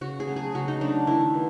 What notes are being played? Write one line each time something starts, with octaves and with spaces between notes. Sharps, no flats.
C#3 F#4
G#4
F#3 A3
G#4
C#3 F#4
D#4
F#3 A3 D4
D#3 E4
B3